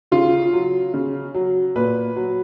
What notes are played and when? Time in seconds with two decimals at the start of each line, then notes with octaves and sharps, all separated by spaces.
0.12 C#3 F4
0.53 F#3
0.94 C#3
1.35 F#3
1.76 A#2 B4
2.16 F#3